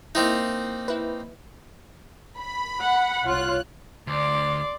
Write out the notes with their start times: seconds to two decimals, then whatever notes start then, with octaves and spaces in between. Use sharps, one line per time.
0.15 A#3 C4 D#4 E4
0.88 E4 B4
2.38 B5
2.81 F#5
3.27 C2 F4 C#5 F#6
4.07 D2 D5 C6 D6